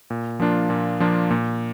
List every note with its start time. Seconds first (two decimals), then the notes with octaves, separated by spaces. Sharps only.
0.10 A#2
0.40 F3 A#3 D4 F4
0.70 A#2
1.00 F3 A#3 D4 F4
1.31 A#2